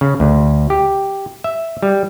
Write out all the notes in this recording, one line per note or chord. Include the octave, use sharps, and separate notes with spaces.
C#3
D2
G4
E5
G3